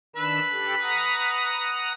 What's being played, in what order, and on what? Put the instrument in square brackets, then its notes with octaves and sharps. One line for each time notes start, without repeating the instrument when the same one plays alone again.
[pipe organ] D#3 D4 E6 [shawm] B4
[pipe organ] G4 A4
F#5 A#5 D#6